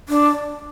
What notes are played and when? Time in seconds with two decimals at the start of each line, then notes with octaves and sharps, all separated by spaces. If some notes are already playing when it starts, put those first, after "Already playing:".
0.09 D4